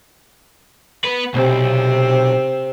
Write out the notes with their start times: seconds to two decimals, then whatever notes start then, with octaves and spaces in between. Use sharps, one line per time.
1.04 B3 B4
1.34 B1 C3 C4